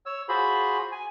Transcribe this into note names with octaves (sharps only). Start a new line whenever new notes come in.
C#5 E6
F4 F#4 G#4 C5 B5
G#5